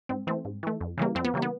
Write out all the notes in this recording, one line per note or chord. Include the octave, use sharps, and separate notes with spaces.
G#2 C4
E3 A3 C4
G#2
E3 A3
F2
C#3 E3 G3 A#3
F2 C4
B3
C#3 E3 G3 A#3
B3